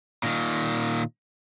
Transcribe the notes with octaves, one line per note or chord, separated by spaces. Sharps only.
A#2 D#3